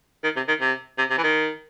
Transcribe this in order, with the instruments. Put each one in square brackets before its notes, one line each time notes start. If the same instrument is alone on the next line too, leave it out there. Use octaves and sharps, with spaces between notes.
[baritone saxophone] D#3
C3
D#3
C3
C3
C3
E3
D#3